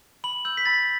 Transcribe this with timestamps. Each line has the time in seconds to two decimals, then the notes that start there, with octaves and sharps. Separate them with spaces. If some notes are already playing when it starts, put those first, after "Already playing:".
0.24 B5 F#7
0.45 E6 G6 F#7
0.57 B6
0.65 B5 A6